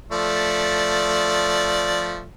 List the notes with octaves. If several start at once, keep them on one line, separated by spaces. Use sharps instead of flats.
F3 A3 D5